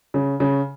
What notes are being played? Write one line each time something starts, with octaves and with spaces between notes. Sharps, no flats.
C#3
C#3